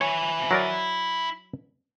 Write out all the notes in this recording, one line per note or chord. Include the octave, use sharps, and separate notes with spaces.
E4 C#5 G#5
F#3 A#4 D5